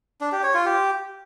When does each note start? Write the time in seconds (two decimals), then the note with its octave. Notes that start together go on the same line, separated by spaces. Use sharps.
0.21 D4
0.32 G4
0.43 C#5
0.54 F4
0.66 G4